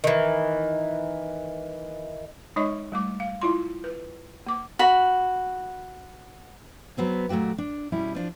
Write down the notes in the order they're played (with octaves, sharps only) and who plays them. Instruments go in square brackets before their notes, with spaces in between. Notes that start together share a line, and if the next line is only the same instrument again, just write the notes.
[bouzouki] D#3 E3
[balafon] G#3 D#4 C#5 D#5 C#6
G3 A3 D6
F5
E4 F4 C6
B4
A#3 D6
[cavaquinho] F#4 B5
[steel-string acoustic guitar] F#3 B3 C4 G#4
A#2 F#3 A3 F#4 G4
D4
B2 G3 C#4 E4
F3 D4 F4